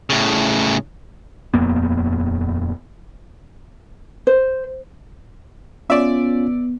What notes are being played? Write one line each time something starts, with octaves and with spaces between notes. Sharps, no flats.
A2 C#3
D#1 F2 A#3 B3
C5
B3 C#4 F4 D5 E5